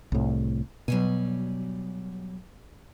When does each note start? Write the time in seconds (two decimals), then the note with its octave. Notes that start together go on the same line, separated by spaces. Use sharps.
0.12 C2 A2
0.88 B2 F#3 G3 G#5